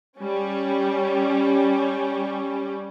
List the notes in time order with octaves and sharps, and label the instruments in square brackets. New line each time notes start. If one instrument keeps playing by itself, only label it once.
[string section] G3 C#4